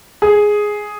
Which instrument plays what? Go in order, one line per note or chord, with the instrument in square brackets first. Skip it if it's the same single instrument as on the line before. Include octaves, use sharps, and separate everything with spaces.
[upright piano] G#4